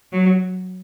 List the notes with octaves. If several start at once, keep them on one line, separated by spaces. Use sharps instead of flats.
F#3